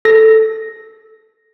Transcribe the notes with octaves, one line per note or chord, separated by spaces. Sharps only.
A4 A#6